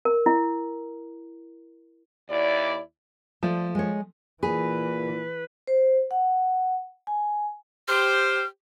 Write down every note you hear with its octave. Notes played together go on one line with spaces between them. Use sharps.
A#4
E4
D#2 E4 D5
F3 A3 D5
G#3 C#5
A#2 E3 G#4 B4
C5
F#5
G#5
G4 C5 F6